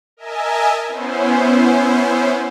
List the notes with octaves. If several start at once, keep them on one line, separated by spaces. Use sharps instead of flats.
A#4 D#5 E5 G#5 A5
B3 C#4 E4 C5